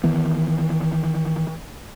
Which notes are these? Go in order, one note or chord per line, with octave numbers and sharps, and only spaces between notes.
D#3 E3 B3